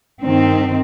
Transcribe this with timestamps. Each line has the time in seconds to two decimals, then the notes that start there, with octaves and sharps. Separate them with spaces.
0.23 G2 D#3 C4